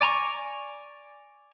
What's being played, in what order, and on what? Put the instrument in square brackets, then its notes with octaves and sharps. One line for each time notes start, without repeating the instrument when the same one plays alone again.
[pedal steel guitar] D5 G#5 A#5 C#6